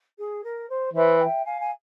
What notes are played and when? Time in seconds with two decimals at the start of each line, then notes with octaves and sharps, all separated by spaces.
0.18 G#4
0.43 A#4
0.69 C5
0.93 E3 C5 E5
1.18 E5 G5
1.44 F5 G#5
1.60 G#5